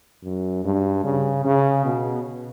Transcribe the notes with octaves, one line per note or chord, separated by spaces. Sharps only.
F#2
G2
C#3
C#3
B2